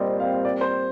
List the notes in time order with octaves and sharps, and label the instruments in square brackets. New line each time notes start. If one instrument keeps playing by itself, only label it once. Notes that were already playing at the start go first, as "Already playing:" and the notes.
Already playing: [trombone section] A#2 G3 C4 [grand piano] F4 C5 D5 D#5
[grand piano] F5
D5
C5